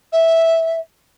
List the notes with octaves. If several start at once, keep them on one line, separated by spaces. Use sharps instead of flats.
E5